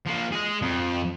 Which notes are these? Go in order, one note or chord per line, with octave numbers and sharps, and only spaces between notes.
F3 A#3
G#4 D#5
F2